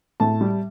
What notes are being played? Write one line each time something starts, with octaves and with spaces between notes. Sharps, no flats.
A2 A5
G3